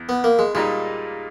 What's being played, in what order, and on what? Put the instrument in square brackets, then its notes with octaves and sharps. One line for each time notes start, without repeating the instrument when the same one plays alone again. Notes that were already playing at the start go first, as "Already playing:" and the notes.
Already playing: [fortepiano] E2
[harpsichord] B3
A#3
G#3
[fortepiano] A#2 G3 A#3 D#4 [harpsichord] G#3